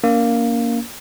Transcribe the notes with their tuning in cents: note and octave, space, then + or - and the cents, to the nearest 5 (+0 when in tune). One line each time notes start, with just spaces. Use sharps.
A#3 +0 C#4 +40